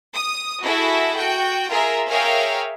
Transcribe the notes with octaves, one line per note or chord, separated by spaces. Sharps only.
D#6
E4 F#4 G#4 A4 E5
F#4 G5
F4 G#4 A#4 E5
G#4 A#4 C#5 E5 F5 G5